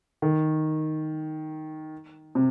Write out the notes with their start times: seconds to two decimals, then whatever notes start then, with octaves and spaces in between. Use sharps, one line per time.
0.22 D#3
2.35 C3